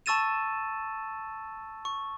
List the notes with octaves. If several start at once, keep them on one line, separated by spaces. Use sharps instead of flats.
A5 C#6 E6 A6 D#7 E7
C#6